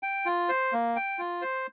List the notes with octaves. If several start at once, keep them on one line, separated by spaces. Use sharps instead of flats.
G5
F4
C5
A#3
G5
F4
C5